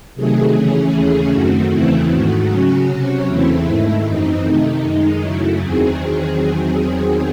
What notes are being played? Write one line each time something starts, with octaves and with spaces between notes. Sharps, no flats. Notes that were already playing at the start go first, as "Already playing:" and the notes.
C3 D#3 F#3 A3 G#4
C#3 E3 A3 C#4
D#2 C#3 E3 A3 C#4
F#2 D#3 A3 C4 F#4
E2 C#3 E3 A3 C4 E4
G#2 D#3 A3 F#4
C#3 F#3 C#4
C3 F#3 C#4
E2 C#3 E3 A3 C4 E4
G#2 D#3 A3 E4
F#2 E3 C4 D#4
C3 D#3 A3
F#2 D#3 G#3
F#2 C#3 F#3 A3 E4
E2 D#3 F#3 C4 G#4